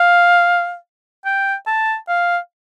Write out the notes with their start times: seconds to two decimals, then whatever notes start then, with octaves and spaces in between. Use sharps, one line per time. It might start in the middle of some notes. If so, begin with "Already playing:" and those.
Already playing: F5
1.25 G5
1.66 A5
2.08 F5